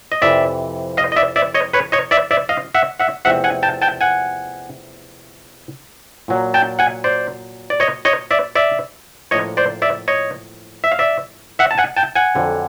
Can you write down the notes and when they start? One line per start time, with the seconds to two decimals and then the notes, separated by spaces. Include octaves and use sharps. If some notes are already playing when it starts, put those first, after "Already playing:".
0.12 D#5
0.22 F2 C3 E3 D5 E5
0.97 D#5 F5
1.12 D#5
1.16 D5 E5
1.36 D5 E5
1.54 C#5 D#5
1.73 B4 C#5
1.92 C#5 D#5
2.11 D5 E5
2.31 D5 E5
2.49 D#5 F5
2.75 E5 F#5
2.99 E5 F#5
3.25 E2 C3 F3 A3 C4 E5 F#5
3.44 F#5 G#5
3.63 G5 A5
3.82 G5 A5
4.01 F#5 G#5
6.28 A#2 F#3 A#3
6.54 G5 A5
6.79 F#5 G#5
7.04 C5 D5
7.70 D5
7.80 C#5 D#5
8.05 C#5 D#5
8.31 D5 E5
8.55 D5 E5
9.31 A2 F3 A#3 D4 C#5 D#5
9.57 C5 D5
9.82 D5 E5
10.08 C#5 D#5
10.84 E5
10.92 F5
10.99 D5 E5
11.59 E5 F#5
11.71 A5
11.78 F#5 G#5
11.97 G5 A5
12.15 F#5 G#5
12.35 F2 D3 F#3